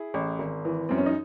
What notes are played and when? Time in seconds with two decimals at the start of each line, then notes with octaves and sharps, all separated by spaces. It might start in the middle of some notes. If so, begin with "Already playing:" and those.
Already playing: E4 G#4
0.14 A1
0.39 G#1
0.65 E3
0.89 F#2 C4
0.98 C#4
1.06 D#4